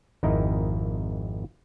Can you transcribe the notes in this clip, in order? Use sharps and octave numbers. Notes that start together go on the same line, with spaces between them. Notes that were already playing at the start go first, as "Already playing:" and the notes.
G#1 F2 D#4 E4 A#4 D#5